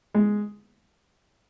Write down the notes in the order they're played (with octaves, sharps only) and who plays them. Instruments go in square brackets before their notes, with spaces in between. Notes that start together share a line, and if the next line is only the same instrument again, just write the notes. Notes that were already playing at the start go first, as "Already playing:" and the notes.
[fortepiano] G#3